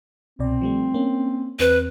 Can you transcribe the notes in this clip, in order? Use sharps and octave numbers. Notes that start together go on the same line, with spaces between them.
C2 B2 C4 D5
F3 G3 A3
A#3 C#4
E2 C4 B4